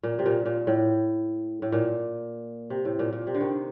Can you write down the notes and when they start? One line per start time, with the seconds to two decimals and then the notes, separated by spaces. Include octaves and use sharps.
0.03 A#2
0.19 C3
0.26 A#2
0.46 A#2
0.67 A2
1.62 A2
1.72 A#2
2.70 C3
2.85 A2
2.99 A#2
3.13 A#2
3.27 C3
3.34 D3
3.41 D#3